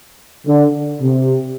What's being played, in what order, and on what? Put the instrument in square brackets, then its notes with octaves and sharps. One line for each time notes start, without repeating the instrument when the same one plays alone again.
[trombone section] D3
C3